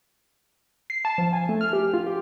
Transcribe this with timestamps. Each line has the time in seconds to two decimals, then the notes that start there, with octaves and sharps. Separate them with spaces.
0.90 C7
1.05 A5
1.18 F3
1.33 G#5
1.49 A3
1.61 F6
1.73 G4
1.94 F4
2.07 G4